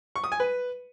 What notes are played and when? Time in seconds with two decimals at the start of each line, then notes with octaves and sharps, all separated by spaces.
0.16 C#6
0.24 D#6
0.32 G#5
0.40 B4